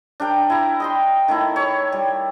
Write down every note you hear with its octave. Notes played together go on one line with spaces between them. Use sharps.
D4 A#4 G5
E4 A#5
D#5 G5 C6
D#3 A3 E4
C#5 C#6
G3